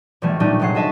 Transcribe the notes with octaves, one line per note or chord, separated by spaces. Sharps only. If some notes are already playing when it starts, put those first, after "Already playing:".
A#1 B2 E3 G3 A3
A#2 G3 A3 D4 D#4 F#4
F1 F#3 G#3 F#5 C7
F#4 A4 D#5 E5 F#5 A5